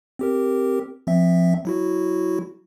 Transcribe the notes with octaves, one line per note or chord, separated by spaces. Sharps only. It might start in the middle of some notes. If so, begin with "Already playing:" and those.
C4 G4 A#4
F3 C4 E5
F#3 E4 F#4